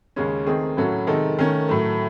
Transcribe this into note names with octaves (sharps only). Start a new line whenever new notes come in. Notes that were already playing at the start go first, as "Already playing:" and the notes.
D#2 C#3 G#3 C#4
D#3 A3 C4 D#4 G#4
A2 F#3 C#4 F#4 A4
C3 D#3 G#3 D#4 A4
D#3 A3 C#4
A2 F#3 A3